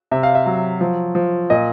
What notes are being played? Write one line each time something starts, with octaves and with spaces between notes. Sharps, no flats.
C3 E5
F5
E5
F#3
F3
F3
A#2 D#5